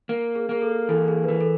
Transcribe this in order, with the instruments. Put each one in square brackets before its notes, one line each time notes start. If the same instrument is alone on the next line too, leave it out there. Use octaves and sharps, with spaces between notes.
[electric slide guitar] A#3
[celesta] G#4
[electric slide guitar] A#3 [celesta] G#4
[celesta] A4
[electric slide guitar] E3 [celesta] A4
[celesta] G#4
B4
[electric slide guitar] E3 [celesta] A#4
[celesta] A4